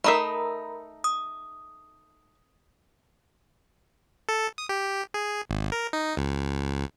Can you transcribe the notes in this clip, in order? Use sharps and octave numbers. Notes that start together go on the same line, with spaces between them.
A3 D#4 A#4 E5 A#5 B5
D#6
A4
D#6
G4
G#4
G#1
A#4
D#4
C#2